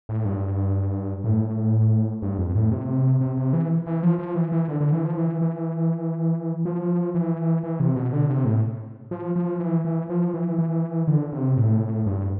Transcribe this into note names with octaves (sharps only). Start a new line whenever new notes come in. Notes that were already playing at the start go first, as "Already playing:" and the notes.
A2
G2
A2
G2
F2
A2
C3
C3
C3
E3
E3
F3
F3
E3
E3
D3
D3
E3
F3
E3
E3
F3
E3
E3
C3
B2
D3
C3
A2
F3
F3
E3
E3
F3
E3
E3
D3
C3
A2
G2